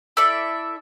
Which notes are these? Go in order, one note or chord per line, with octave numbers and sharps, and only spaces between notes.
E4 A4 D5 E5